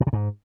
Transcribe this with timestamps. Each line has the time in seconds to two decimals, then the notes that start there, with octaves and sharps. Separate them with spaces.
0.01 A#2
0.07 C3
0.13 G#2